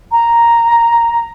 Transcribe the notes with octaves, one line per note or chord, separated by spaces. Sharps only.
A#5